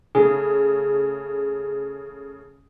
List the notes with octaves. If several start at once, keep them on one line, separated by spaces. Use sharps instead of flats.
C#3 A3 G#4